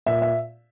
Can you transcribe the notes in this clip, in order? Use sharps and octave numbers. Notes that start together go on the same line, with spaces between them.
A#2 E5
E5